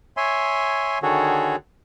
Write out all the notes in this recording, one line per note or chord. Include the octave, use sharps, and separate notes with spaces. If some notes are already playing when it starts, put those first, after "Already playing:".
C#5 E5 G#5 C6
D3 D#3 F#4 G#4 A4 C#5